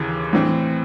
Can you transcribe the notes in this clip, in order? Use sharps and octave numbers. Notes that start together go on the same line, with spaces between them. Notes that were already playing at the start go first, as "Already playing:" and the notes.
Already playing: D#2 C#3 E3
A2 E3 C4